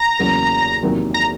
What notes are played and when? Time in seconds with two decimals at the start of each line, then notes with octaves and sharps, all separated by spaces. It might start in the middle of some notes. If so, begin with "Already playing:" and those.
Already playing: A#5
0.19 E2 C#3 F#3 A#3
0.83 E2 C3 D#3 F#3 A#3
1.14 A#5